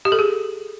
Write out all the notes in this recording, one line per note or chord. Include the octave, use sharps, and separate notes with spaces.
G4
A4
G#4